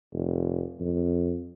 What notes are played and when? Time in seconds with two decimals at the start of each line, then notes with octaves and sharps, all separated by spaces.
0.13 F1
0.80 F2